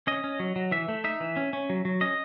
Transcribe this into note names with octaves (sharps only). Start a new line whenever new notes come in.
C#4 D#5
C#4
F#3
F#3
E3 E5
A3
D#4 E5
E3
C#4
C#4
F#3
F#3
C#4 D#5